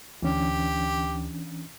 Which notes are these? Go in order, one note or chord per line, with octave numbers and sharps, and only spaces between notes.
D2 E3 C#4 D4 G4